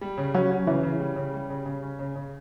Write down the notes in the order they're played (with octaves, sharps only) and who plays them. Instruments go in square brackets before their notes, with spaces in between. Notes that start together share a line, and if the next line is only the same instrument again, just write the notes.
[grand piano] G3
C#3
[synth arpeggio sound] F#3 [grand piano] C#4
[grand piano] C#4
[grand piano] C#3 [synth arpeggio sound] E3
[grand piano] C#3
G3
C#3
G3
C#3
C#3
C#4
C#3
C#3